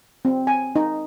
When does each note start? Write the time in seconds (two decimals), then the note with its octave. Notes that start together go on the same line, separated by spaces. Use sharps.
0.25 C4
0.47 G#5
0.76 D#4